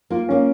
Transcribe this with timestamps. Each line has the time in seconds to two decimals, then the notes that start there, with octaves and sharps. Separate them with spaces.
0.10 A#3 F4
0.29 A#3 C#4